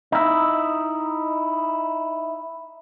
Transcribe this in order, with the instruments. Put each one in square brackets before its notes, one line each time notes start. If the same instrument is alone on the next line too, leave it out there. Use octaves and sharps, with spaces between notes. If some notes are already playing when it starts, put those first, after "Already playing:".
[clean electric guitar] D#4 E4